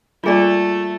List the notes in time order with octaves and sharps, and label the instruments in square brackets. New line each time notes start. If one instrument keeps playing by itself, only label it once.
[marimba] G3 A#3 [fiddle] A3 [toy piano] F4 G#4 D5